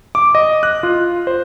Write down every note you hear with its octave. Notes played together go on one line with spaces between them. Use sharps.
D6
D#5
F#6
F4
C5